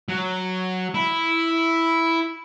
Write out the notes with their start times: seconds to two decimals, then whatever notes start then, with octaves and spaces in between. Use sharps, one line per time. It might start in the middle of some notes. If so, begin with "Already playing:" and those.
0.09 F#3
0.94 E4